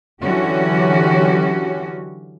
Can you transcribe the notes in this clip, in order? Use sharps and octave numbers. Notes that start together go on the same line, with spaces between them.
D3 E3 F#3 C#4 F#4 G4